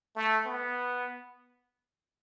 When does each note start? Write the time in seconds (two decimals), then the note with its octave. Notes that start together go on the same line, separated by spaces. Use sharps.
0.16 A3
0.46 B3